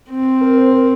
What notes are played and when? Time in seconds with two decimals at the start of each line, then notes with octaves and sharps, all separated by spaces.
0.10 C4
0.41 A#4
0.57 C5
0.72 A#4